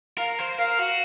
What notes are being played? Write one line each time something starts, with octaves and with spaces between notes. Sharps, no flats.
A#4 F5
C5
A#4 F5
F#4